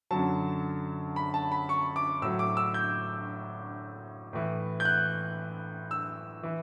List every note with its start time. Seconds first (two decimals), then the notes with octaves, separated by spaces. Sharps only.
0.11 F#2 D3 F#3 A5
1.16 B5
1.34 A5
1.52 B5
1.69 C#6
1.96 D6
2.22 A2 F#3 E6
2.39 D6
2.57 E6
2.74 G6
4.33 A2 E3
4.80 G6
4.85 F#6
5.91 E6
6.43 E3